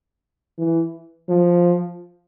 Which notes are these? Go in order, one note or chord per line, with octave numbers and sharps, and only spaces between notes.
E3
F3